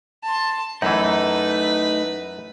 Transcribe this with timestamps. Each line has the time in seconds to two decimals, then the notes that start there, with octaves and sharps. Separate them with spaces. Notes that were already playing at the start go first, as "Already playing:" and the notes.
0.23 A5 C6
0.82 F#2 E3 A3 D#4 B4